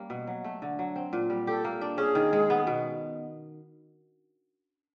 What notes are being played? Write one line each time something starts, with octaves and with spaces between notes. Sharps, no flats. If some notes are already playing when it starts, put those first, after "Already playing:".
Already playing: G3 A#3 C#4
B2
F#3
A3
D3
F#3
C4
A#2
G3
G4 A4
A#3
D4
C#4 G#4
D#3
G#3
B3
B2